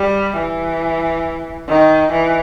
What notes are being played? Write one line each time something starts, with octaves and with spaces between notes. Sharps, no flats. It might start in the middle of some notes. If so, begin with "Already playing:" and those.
Already playing: G3
E3
D#3
E3